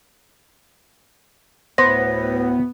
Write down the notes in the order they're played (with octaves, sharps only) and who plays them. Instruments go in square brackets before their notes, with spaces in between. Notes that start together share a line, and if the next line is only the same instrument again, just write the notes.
[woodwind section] D2 A2 [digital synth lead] B3 [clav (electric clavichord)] C5 [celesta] A#6